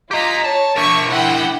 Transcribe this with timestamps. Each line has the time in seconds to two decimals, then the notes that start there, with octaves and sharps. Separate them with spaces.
0.11 F4 G4 D#5 A#5 B6
0.44 C#5 A5
0.76 D4 A#4 E5 C#6
1.08 E4 F#5 G5